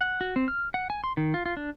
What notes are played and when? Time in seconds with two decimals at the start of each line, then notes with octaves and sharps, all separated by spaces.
0.01 F#5
0.21 F#4
0.36 C4
0.48 F6
0.74 F#5
0.90 G#5
1.04 C6
1.17 D#3
1.34 F4
1.46 F4
1.57 D4